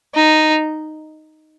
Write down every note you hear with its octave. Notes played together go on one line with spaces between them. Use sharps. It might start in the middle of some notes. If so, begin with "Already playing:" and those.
D#4